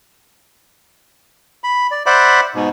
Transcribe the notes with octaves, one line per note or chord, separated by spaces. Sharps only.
B5
D5
C5 D5 E5 F#5 B5 D6
G#2 B2